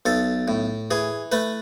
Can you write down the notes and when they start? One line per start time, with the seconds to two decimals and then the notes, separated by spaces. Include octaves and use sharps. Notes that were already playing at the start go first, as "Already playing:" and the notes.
0.06 B1 A4
0.48 A2
0.91 E3 G#4
1.32 A3 B4